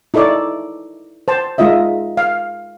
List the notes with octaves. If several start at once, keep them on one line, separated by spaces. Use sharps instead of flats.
D#4 E4 A4 C#5 D5
C5 A5
G#3 D#4 F4 D#5 E5
F5